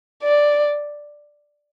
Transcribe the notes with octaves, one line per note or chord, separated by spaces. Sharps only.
D5